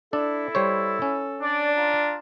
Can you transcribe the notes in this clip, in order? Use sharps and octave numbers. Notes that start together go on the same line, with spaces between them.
D4 E4 A4
G3 C5 C#5
C#4
D4 D5
F4 A#5